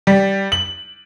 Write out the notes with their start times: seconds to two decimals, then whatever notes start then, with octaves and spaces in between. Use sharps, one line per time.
0.07 G3
0.52 F#7